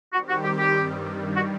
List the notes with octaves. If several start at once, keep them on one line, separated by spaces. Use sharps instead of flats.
D#3 G3 C4 F#4 G4
F#4
G4
G4
G2 D#3 G3
F#4